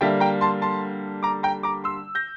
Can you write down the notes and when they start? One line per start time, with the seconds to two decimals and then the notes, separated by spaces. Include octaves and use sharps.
0.01 D3 G3 A#3 E5 G5
0.20 G5 A#5
0.41 A5 C6
0.62 A5 C6
1.23 A#5 D6
1.43 G5 A#5
1.63 A#5 D6
1.84 C6 E6
2.15 G6 A#6